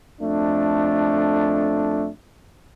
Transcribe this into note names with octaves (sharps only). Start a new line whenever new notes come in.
F2 A3 D4